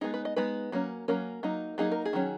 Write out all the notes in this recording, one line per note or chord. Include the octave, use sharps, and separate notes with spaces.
G#3 B3 D#4 G#4
B4
D#5
G#3 B3 D#4 B4
F#3 A#3 C#4
F#3 A#3 C#4 A#4
F#3 A#3 D#4
F#3 A#3 D#4 G#4
A#4
G#4
D#3 F#3 C#4